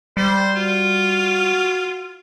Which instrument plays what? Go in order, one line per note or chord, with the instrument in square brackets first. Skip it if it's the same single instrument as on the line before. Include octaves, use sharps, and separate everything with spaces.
[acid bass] G3 [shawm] C5
[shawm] F4 [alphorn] F#4